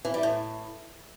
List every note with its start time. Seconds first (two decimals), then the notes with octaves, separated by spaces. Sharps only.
0.05 E3
0.14 G3
0.23 A2